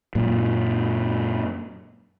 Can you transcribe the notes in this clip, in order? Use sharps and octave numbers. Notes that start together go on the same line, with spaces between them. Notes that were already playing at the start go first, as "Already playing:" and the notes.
F#2 A#2